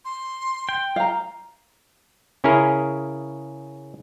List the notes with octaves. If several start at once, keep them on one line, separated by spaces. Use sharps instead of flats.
C6
G5
F5 A#5
C#3 C#4 E4 G#4 A#4